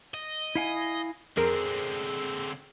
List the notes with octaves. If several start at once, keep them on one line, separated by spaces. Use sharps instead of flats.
D#5
E4 F5 G#5
F2 D3 C4 G#4 A#4